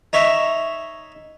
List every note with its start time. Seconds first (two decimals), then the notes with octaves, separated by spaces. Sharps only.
0.13 D#4 C#5 E5